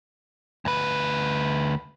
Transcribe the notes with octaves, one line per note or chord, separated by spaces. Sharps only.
D2 B4